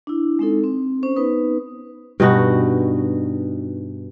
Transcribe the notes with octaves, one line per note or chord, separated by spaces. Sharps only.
D4 E4
G#3 C4 D#4 A4
C4
C#4 C5
B3 D#4 B4 D#6
G2 B2 D#4 F#4